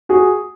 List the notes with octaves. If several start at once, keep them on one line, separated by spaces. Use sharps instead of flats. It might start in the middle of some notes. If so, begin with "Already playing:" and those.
F#4 G#4